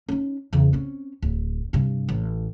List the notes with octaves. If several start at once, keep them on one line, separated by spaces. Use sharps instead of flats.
C#4 D#4
E2 C#3
C4 C#4
D1
G2 C3
A1